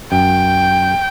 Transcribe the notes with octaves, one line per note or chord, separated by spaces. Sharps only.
F#2 G5